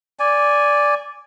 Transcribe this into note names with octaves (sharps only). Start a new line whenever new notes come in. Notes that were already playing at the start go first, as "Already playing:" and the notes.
D5 G#5